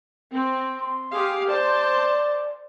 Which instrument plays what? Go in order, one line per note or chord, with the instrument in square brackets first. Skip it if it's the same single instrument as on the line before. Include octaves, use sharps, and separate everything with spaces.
[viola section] C4
[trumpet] C6
[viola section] G4 G#4 F5
[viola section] C5 A5 [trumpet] D5